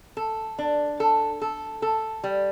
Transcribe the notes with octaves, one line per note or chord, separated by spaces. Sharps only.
A4
D4
A4
A4
A4
G3